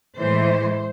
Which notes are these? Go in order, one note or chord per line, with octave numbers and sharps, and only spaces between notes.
A2 E3 G#3 C5